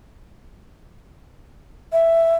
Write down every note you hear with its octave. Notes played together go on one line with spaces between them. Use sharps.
E5